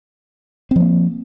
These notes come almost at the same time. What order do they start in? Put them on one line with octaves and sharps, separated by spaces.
C4 F3 A#3